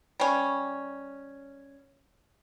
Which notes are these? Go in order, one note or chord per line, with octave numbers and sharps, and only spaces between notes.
G3 C#4